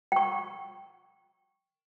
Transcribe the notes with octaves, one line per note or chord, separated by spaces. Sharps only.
G5 C#6